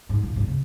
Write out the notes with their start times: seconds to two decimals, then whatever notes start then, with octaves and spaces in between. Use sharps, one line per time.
0.09 G#2
0.23 A#2
0.36 G#2
0.47 C#3